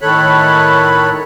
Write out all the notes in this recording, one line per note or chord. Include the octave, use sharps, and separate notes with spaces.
A2 D#3 A4 C#5 B5 F#6